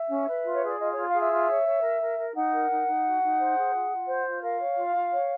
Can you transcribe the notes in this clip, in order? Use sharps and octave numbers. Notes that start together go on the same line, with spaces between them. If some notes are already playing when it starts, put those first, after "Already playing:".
Already playing: E5
C#4
B4
F4
C#5
G#4 D5
F4 D#5
F4 C#5
F5
G#4 E5
F4
C#5
C#5
A#4
A#4
A#4
D#4 F#5
A#4
D#4
D#4
F#4
D#4
C5
G#4
F4
F4
C5
F4
A#4 F5
C#5
F4
F4
C#5